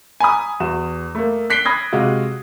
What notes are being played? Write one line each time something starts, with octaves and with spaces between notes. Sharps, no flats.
G#5 A#5 B5 D#6
E2 F#4 E7
A3 A#3
F#6 B6 C7 D7 G7
B5 D#6 G#6 A#6
C3 G#3 F4 F#4